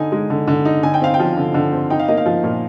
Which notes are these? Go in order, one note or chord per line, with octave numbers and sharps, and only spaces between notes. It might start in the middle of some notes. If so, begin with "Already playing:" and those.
Already playing: D3 D#4 G#5
G#3
D3
D3
D#4
D3 G#5
G5
C4 F5
G5
F3
D3
D3
C4
D#4 G5
F5
A#3 D#5
F5
F3
A#2